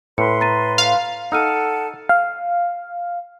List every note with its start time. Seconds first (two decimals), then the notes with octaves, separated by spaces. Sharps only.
0.18 A2 B4 C6 C#7
0.40 A#5 A6 D#7
0.78 F5
1.32 D#4 A4 F#5 E6 F6 D#7
2.09 F5